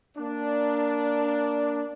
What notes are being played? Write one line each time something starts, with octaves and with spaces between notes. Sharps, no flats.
A#3 D4